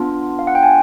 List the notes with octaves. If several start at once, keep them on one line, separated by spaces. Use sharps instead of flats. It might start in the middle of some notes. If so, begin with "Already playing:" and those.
Already playing: B3 D4 F4
F5
F#5
G5
G#5